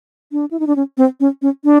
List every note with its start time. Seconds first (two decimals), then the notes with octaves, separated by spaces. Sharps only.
0.32 D4
0.51 E4
0.60 D#4
0.67 D4
0.76 C#4
0.98 C4
1.20 C#4
1.42 C#4
1.64 D4